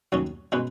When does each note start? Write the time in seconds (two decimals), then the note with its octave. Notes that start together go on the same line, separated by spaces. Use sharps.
0.12 D#2 D#3 F#3 C#4
0.52 B2 G#3 C#4 B4